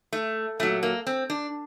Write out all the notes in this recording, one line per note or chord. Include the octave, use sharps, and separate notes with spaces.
A3
A#2 F#3 A3
A#3
C4
D4